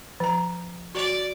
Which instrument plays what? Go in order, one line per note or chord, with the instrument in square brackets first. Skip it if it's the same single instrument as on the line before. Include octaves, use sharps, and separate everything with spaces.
[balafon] F3 A#5
[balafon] F#4 [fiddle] D5